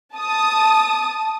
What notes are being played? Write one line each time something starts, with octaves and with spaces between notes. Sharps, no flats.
A5 D#6